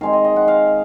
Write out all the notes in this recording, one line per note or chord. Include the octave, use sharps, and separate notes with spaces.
D#3 G#3 C4 F5
D#5
D#5
F#5
F5